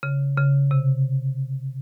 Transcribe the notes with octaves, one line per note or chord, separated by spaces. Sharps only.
C#3
C#3
C3